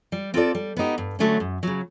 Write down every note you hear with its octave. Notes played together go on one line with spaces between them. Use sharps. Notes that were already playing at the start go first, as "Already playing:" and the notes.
G3
C4 F4 A4 D5
G3
B3 D#4 G4
G2
D3 F#3 A3 C#4
F#2
C#3 F#3